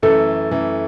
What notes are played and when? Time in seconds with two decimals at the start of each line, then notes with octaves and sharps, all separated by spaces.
0.02 F#2 E3 A3 A4
0.51 F#2 E3 A3